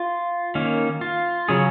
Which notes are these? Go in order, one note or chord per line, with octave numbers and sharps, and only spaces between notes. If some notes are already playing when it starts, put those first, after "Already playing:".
Already playing: F4
D#3 A#3 C#4
F4
C#3 F#3 C#4 G#4